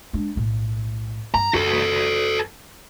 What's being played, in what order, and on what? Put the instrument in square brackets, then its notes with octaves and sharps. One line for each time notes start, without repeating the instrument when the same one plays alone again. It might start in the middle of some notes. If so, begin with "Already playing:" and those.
[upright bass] G#3 D4
B1 A2
[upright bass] G2 [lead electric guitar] A#5
[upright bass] F#2 [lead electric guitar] F#4 A4